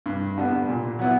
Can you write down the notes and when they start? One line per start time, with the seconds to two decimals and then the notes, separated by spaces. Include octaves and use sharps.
0.06 G2
0.38 D3 G3 B3
0.69 A#2
0.99 F#3 B3 E4